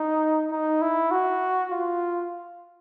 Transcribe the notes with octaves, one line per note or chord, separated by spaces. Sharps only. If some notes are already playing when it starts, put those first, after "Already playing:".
Already playing: D#4
D#4
E4
F#4
F4